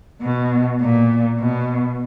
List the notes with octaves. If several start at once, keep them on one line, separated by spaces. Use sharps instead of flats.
B2
A#2
B2